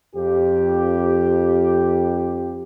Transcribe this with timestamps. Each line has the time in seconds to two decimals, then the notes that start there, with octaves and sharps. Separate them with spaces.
0.15 F2 G4